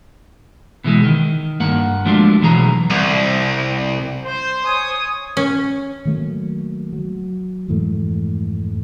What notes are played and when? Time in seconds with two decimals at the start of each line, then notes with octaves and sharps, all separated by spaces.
0.84 B2 E3 G#3
1.04 D#3
1.60 G2 A#3 F#5
2.05 F3 F#3 G#3 A3 D4 F4
2.42 B1 E3 F#3 G#4 A#5
2.90 C2
4.23 C5
4.65 C#5 G#5 D#6
5.37 C#4
6.05 D#3 F#3 A3 A#3
6.93 F#3
7.68 F2 G#2 E3 A3